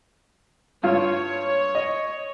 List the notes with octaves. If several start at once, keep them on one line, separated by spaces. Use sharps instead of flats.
G2 F4 C#5
D#5